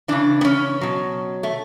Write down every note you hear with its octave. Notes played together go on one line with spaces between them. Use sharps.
C#3 E3 D4
B3
C#4
B2 F#3
A3